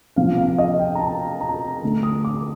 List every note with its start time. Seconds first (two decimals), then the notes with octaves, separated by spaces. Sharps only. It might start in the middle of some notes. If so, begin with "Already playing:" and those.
0.16 C3 F3 A#3 F5
0.38 F5
0.58 D#5
0.79 G5
0.95 A#5
0.99 A5
1.41 A#5
1.83 D3 A3
2.03 D#6
2.25 D6